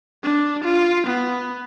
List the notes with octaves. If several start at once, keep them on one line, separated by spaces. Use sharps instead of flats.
D4
F4
B3